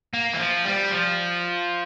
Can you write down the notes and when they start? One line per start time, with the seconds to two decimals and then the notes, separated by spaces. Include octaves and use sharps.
0.14 A#3
0.33 E3
0.39 F3
0.65 G3
0.91 F3